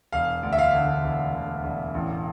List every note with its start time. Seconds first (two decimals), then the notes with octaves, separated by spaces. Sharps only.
0.12 E1 F5
0.43 D2
0.53 E5
0.59 F5
0.73 D3
1.04 E1
1.34 D3
1.64 E1
1.94 A1